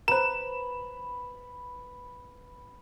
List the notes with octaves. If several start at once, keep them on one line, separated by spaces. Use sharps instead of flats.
B4 C5 A#5 E7